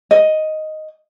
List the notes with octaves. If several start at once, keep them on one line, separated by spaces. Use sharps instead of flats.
D#5